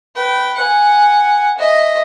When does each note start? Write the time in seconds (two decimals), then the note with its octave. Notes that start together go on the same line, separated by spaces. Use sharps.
0.15 B4 G5
0.56 F#5 G#5
1.58 D#5 E5